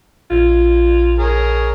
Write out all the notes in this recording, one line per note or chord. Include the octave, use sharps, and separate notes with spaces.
A#1 F4
G#4 A#4 C#5